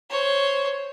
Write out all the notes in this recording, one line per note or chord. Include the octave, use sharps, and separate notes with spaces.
C5 C#5